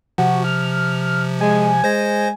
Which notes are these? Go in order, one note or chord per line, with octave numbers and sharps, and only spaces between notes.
C3 F3 F#4
F6
G#3 G#5
G#3 C5 A#6